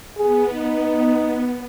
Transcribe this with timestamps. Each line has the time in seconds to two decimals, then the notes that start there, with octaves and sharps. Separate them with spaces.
0.18 B3 G#4
0.53 D#4